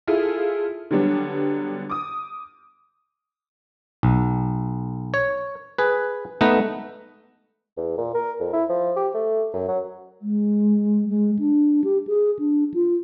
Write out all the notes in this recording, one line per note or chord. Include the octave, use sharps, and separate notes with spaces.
E4 F4 G#4 A4
D3 F#3 G3 B3 D4
D6 D#6
B1
C#5
G#4 B4
A3 B3 D#4 B4 D#5
E2
A#2
A#4
F2
E4
F3
G4
A3
F#2
F#3
G#3
G#3
D4
G4
G#4
D4
F4